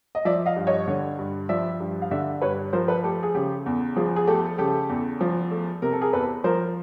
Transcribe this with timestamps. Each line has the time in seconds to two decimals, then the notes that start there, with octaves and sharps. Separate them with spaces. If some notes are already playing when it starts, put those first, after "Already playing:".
0.15 D#5
0.25 F3 D5 E5
0.46 D#5 F5
0.56 G2
0.67 C#5 D#5
0.88 D3
1.19 G2
1.49 F3 D5 E5
1.80 G2
2.02 F5
2.11 D3 D5 E5
2.41 G2 B4 C#5
2.73 F3 A#4 C5
2.88 A4 B4
3.03 A3 G4 A4
3.23 G#4
3.35 C#3 G4
3.66 E2
3.96 F3 G#4
4.16 G#4
4.27 A3 G4 A4
4.58 C#3 G4 A4
4.89 E2
5.21 F3
5.51 A3
5.82 C3 A#4
5.92 A4
6.02 G#4 A#4
6.13 E2 A4 B4
6.44 F3 A#4 C5